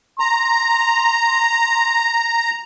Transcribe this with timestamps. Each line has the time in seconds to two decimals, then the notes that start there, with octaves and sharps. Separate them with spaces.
0.20 A#5 C6